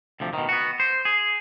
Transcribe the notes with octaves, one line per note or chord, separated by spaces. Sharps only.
D2 C3 F3
B2 D#3
B3 F#4
C5
G#4